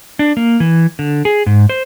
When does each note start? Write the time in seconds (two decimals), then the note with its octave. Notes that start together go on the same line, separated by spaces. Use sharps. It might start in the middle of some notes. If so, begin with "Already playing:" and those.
0.19 D4
0.37 A#3
0.60 E3
0.99 D3
1.25 G#4
1.46 G#2
1.69 C5